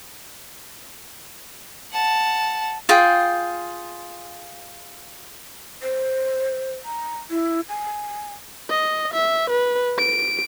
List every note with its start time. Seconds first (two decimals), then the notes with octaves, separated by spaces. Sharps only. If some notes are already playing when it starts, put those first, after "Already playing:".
1.91 F#5 A5
2.89 F4 G#4 G5
5.83 C5
6.85 A#5
7.30 E4
7.69 G#5
8.70 D#5
9.13 E5
9.50 B4
9.98 D7